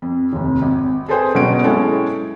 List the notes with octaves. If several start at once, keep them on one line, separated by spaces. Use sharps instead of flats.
F2
F1 D#2
G#1
G#4 A4 B4 C5 G5 G#5
G1 B2 F#3 C#4 F#5 D7
G#3 C#4 E4 A4 G5